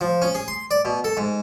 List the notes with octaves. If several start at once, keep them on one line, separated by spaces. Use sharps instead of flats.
F3
C#4
G#4
C6
D5
B2
A4
G#2